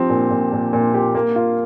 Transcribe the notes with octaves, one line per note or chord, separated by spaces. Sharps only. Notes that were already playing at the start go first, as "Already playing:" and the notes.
Already playing: F3 C4 G4
A#2
A#2
A#2
A#2
G4
A#3
F4